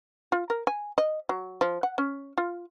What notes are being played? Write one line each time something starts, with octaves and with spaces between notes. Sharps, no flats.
F4
A#4
G#5
D#5
F#3
F3
F#5
C#4
F4